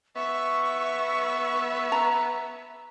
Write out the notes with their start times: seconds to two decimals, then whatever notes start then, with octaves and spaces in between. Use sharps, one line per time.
0.16 B3 E5 C#6
1.92 A#5